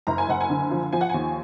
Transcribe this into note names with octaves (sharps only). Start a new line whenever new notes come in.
F#1 A#5
G#5
F#1 F#5
G#5
D3
F3
F3 G#5
F#5
D#2 G#5